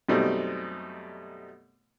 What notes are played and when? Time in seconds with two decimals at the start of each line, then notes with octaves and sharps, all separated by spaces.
0.09 F#2 B2 G3 A3 C4 D#4